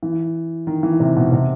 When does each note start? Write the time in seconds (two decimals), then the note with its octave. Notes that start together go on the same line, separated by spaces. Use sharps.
0.03 E3
0.67 D#3
0.83 E3
1.00 C3
1.16 B2
1.32 C3